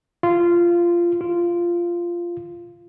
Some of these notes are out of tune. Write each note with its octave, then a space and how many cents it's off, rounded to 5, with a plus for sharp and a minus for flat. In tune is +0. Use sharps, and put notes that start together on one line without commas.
F4 -15
F4 -10